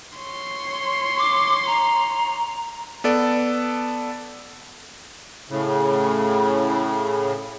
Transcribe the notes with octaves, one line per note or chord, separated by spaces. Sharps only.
C#5 C6
D6
A#5
B3 A4 D5
A2 C#3